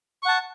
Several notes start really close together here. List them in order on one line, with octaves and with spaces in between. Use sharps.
C#6 F#5 A5